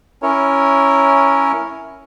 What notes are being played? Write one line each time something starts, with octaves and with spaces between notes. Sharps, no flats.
C#4 E4 A#4 C#5